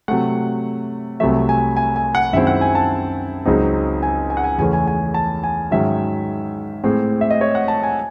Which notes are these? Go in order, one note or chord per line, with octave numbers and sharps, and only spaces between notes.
C3 F#3 A3 F#5
C2 C3 F#3 A3 E5
G#5
G#5
G#5
F#5
F#2 D#3 G#3 C4 E4 E5
F#5
G#5
A5
C#2 C#3 F#3 C4 D#4
G#5
G#5
F#5
G#5
E2 C#3 E3 A3 C#4 G#5
G#5
G#5
A5
G#5
G#2 D#3 F#3 C#4 E5
A2 G#3 C4
E5
D#5
C#5
F#5
A5
G#5